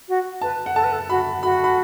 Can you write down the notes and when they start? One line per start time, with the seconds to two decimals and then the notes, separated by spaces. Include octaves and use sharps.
0.08 F#4
0.41 B4 A5
0.66 F#5
0.75 A4 A5
0.84 B4
0.93 A4
1.09 F#4 B5
1.43 F#4 B5
1.64 B5